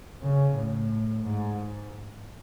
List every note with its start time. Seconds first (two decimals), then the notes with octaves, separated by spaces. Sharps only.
0.22 C#3
0.56 A2
1.23 G#2